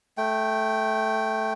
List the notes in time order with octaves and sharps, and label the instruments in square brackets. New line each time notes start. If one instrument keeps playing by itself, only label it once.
[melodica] A3 G5